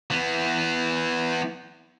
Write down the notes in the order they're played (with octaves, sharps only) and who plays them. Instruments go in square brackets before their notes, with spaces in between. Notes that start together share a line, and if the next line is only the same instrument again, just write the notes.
[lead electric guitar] E3 B3